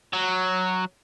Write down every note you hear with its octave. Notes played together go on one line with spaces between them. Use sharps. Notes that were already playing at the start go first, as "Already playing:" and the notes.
F#3